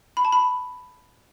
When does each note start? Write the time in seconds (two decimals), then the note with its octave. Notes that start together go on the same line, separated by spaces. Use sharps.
0.17 B5
0.25 A5
0.32 B5